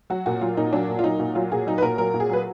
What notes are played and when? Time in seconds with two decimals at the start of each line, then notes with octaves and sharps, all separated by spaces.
0.10 F#3 F#4
0.26 A#2 F#4
0.41 F#3 F4
0.57 A#2 D#4
0.73 F#3 D4
0.89 A#2
0.99 F4
1.04 F#3 D#4
1.20 A#2
1.35 F#3 F4
1.52 A#2 G#4
1.67 F#3 D#4
1.78 B4
1.82 A#2 A#4
1.98 F#3 A#4
2.14 A#2
2.20 G#4
2.29 F#3 B4